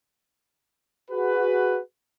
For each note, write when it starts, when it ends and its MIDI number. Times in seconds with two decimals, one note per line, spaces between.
1.11 1.79 66
1.11 1.79 68
1.11 1.79 71